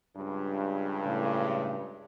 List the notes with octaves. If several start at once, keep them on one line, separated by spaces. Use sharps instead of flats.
C#2 G2
A2 C#3